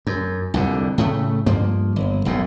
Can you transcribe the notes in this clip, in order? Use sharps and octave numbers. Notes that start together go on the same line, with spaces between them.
F#2
C2 F2 D3
A2 C#3 A3
G2 F3 A#3
G1
E1 B1 F#2 A2